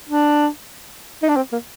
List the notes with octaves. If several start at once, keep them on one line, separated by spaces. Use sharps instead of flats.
D4
D#4
D4
C4
A#3